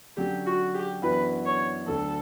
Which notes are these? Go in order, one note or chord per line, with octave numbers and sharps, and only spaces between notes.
D3 F#3 C#4 G4
F#4
G4
F#2 E3 B3 D4 F#4 B4
C#5
D2 D3 F#3 A4